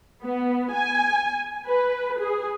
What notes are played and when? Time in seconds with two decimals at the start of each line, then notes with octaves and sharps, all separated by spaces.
0.23 B3
0.73 G#5
1.67 B4
2.19 G#4